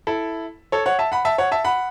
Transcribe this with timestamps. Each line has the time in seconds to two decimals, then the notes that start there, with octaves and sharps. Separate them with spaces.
0.07 E4 A4
0.72 A4 C#5
0.86 C#5 F#5
0.99 E5 A5
1.12 F#5 B5
1.25 E5 A5
1.38 C#5 F#5
1.52 E5 A5
1.65 F#5 B5